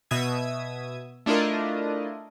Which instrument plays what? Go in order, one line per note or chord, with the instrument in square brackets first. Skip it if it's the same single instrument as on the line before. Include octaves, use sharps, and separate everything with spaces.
[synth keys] B2 E5 D#6 G#6
A3 D4 E4 F4 A#4 D#5